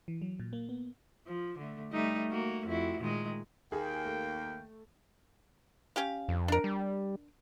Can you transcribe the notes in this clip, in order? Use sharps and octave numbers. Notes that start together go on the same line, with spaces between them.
E3
F#3
A#2
A#3
B3
F3
D3 A3
G3 A3 D#4
A#3 F#4
F2 E4 F#4
A#2 D#3 G#3
D#2 A#3 G#4 G5
A3
C#4 G4 F5
F2
D4 A#4
G3